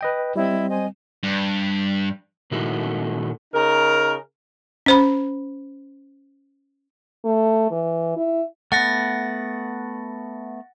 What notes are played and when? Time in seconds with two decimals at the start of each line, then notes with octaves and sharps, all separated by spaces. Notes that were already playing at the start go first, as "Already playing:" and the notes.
0.01 B4 D#5 G5
0.36 G3 C4 E4 D#5
0.70 C5 D#5 G#5
1.23 G2
2.51 A#2 D#3 G#3 A3 E4 F#4
3.54 C#3 D#4 A#4
4.86 C#4 C5 B5
7.24 A3
7.71 E3
8.17 E4
8.72 A3 B3 F#5 A6 A#6